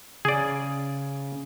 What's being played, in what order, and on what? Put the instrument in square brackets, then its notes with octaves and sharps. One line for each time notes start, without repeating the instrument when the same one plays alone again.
[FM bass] C#3 [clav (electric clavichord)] G#4 D5